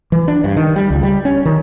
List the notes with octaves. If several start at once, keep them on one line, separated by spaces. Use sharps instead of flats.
E3
D4
G2
D#3
G3
C#2
G3
C#4
D#3